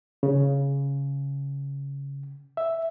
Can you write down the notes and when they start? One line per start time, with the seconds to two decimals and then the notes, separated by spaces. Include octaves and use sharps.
0.23 C#3
2.57 E5